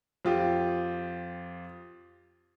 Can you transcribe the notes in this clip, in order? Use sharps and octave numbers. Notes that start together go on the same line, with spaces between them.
F2 F4 G4